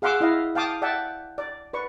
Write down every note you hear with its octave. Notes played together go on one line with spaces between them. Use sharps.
G#4 F5 F#5 C6 D6 E6
E4 D#5 F5
F5 G5 A5 D6 D#6
D5 E5 F#5 G5 A5
D5
B4 D5 C#6